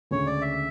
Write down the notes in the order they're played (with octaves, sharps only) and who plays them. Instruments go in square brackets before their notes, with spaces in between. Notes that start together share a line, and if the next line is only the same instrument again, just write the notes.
[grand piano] D2 C#3 G#3 [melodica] C#5
[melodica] D5
E5